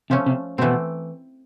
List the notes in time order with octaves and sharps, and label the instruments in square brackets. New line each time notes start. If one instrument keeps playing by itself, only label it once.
[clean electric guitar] C3 [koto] F3 A3 C#4
[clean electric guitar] C3
[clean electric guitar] B2 [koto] E3 A3 C4